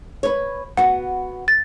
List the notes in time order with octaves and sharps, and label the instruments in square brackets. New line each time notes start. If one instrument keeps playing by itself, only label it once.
[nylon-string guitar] B4 C#5
[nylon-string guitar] B3 F#4 [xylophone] F#5
[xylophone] A6